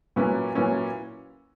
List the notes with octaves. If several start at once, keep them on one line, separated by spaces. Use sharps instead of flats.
A#2 F#3 C#4 E4 B4
A#2 F#3 C#4 E4 B4